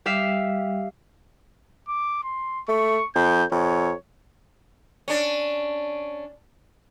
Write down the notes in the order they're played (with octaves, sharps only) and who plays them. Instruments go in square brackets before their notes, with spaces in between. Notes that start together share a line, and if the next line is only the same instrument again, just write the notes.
[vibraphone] G3 [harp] G4 E5 F5
[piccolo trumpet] D6
C6
[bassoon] A3 [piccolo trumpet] C#6
[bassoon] F2 [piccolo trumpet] G6
[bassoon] F2 [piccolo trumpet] C#5
[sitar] C#4 D4